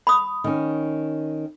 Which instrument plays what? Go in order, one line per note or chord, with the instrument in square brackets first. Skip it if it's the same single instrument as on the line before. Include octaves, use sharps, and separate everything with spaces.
[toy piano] B5 D#6
[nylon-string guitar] D#3 C#4